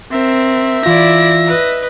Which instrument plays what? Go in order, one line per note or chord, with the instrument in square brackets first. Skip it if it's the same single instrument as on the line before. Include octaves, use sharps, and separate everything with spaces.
[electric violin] C4 [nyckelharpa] A#4 [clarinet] E5
[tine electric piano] E3 F4 [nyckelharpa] E4 D5 [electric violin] A#6
[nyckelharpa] B4 D#5